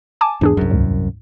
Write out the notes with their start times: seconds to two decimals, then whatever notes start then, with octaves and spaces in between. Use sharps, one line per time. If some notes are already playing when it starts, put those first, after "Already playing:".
0.21 G#5 A5 D6
0.41 E2 G#2 D4 G#4
0.57 C2 F#2
0.71 D2 G#2